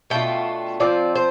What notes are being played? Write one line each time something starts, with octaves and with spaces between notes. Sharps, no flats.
B2 A3 D4 F4 G5
F3 C4 F4 D5
C5